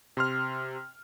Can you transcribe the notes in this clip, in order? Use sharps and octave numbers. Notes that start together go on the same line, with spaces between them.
C3 C6 F6